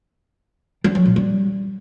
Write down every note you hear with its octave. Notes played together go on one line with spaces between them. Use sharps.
G3
F#3
A#2
G3